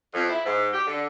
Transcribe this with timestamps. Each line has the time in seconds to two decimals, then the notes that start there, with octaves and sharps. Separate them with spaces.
0.14 F2
0.29 E4
0.46 G#2
0.73 G4
0.87 D3